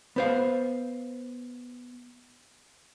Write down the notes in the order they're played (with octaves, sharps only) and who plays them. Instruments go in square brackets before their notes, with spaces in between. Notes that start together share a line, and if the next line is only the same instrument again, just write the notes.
[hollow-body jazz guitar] B3 C5 F5